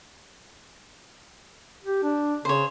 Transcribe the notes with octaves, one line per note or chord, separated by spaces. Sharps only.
G4
D4
C#3 C5 C#5